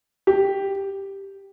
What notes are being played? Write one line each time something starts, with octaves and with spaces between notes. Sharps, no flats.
G4